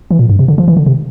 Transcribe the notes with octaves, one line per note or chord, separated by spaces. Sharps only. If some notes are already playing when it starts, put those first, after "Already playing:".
E3
A#2
G2
C3
D3
F3
E3
D3
C3